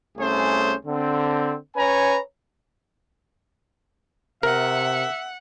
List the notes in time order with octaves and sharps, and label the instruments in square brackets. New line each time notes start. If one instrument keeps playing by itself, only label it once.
[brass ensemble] C2 A3 C#4 G#4 C5
D3 C4
C#4 B4 C#5 G#5 A#5
[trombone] C3 [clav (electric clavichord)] A#4 [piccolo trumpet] E5 [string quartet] F#5